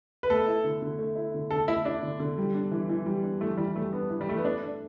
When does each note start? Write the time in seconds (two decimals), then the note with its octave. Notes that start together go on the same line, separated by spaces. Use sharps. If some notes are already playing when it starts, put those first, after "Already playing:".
0.23 B4
0.30 A3 A4
0.47 E4
0.64 D3
0.82 D3
0.99 A3
1.16 E4
1.34 D3
1.51 D3 A4
1.68 A3 E4
1.85 D4 E4
2.03 D3
2.19 D3
2.38 G3
2.54 D4
2.71 E3
2.89 E3
3.06 G3
3.23 D4
3.41 E3 A3
3.58 E3 G3
3.76 G3 A3
3.93 B3 D4
4.10 E3
4.21 G3
4.27 E3 A3
4.37 B3
4.44 A3 D4
4.62 D4